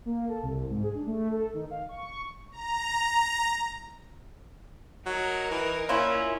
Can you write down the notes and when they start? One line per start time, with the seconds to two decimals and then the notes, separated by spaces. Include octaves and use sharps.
0.06 A#3
0.28 A4
0.43 C2
0.70 G#2
0.83 G#4
0.95 D4
1.07 A3
1.31 A4
1.54 D#3
1.71 F5
1.89 C#6
2.52 A#5
5.06 F#3 D#4 A#4
5.51 E3
5.89 A#2 C#4 E4 F4